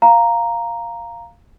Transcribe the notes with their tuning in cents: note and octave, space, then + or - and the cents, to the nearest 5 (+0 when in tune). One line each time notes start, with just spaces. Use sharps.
F5 +0 A#5 +0